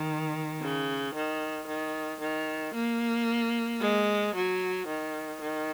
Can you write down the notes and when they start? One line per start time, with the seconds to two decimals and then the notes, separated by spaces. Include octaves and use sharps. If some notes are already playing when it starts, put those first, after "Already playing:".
Already playing: D#3
0.61 C#3
1.14 D#3
1.68 D#3
2.21 D#3
2.74 A#3
3.81 G#3
4.35 F#3
4.88 D#3
5.41 D#3